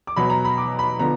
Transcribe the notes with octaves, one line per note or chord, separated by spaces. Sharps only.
D6
B2 F#3 B3 B5
A#5
B5
D6
B5
D3 F3 B3 A#5